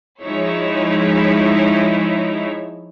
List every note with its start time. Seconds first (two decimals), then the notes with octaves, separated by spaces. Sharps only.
0.22 F3 G#3 D#4 E4 C#5 E5